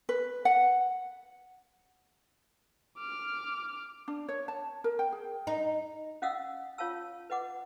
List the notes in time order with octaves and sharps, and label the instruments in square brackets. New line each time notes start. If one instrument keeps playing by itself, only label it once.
[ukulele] B4
F#5
[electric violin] D6 F6
[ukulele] D4
C#5
A5
A#4
G5
G#4
[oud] D#4
[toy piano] C#4 D#5 F5 F#5 D#6 E6
F4 C#5 F5 A5 E6
B4 D#5 F#5 D6